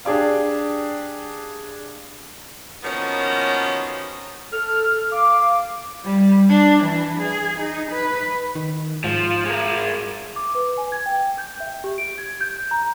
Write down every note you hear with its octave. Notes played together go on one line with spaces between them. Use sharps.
D4 G4 G#4 D5 F5
D#3 F3 F#3 A#3 B3 C#4
A4 F6
F5 D6
G3
D4
E3
G#4
D#4
B4
D#3
G#2 F3
G#3 A#4
D6
B4
G#5
G#6
G5
G6
E5
G4
D7
G#6
G6
A#5